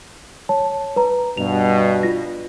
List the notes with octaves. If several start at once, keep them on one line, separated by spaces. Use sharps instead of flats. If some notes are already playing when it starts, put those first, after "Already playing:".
C#5 A5
B4 A#5
G2 B2 F7
F4 A#6